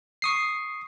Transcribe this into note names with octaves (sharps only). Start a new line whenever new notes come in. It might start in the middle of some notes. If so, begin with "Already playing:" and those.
C#6 D#6 C7